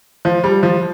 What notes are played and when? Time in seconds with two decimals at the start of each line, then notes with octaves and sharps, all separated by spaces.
0.25 F3
0.44 G3
0.63 F3